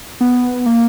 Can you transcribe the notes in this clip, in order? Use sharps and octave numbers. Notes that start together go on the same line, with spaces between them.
B3
A#3